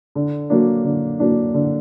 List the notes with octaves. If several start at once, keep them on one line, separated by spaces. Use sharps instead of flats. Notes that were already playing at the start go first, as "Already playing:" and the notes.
D3
F#3 A#3 D4
D3
F#3 A#3 D4
D3